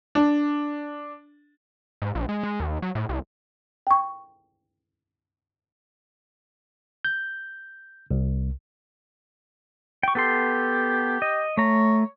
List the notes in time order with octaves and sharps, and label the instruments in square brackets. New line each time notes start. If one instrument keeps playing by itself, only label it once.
[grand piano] D4
[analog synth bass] G#2
A#1
G#3
G#3
D#2
F#3
A2
C2
[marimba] G5 C#6
[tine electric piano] G6
C2
[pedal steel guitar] G5 C#6
[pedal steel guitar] B3 A4 C6 [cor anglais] G4
[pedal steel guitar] D#5
[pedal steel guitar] A3 A#5 [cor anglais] C#5